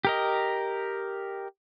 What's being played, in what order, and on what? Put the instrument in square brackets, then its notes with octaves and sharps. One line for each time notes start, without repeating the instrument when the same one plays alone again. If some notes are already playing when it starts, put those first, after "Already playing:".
[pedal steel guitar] G4 A#4 D#5